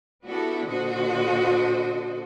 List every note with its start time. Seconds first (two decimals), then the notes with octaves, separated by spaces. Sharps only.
0.25 B3 D4 E4 F#4 G4 A4
0.69 A#2 D3 F#4 A4 C5 D#5